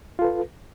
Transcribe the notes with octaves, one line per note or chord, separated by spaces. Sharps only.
F4 A4 B4